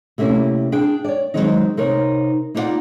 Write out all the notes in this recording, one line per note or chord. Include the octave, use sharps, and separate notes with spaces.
C3 A3 A#3 C#4 E4
D4 G#4 G5
C#5 D5
D#3 F3 F#3 G#3 C4 D#4
C3 D#4 A#4 C#5
A#3 D#4 F4 B4 D5 F#5